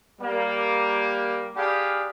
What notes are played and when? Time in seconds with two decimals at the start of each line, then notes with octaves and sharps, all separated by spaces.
0.21 G3 A#3
1.57 D4 G4 G#4 F5 B5